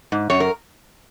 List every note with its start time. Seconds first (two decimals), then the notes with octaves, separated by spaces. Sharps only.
0.12 G#2
0.30 F#2 C#5
0.40 A#4